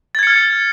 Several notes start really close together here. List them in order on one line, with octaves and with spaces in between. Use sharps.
A6 G#6 C#7 F6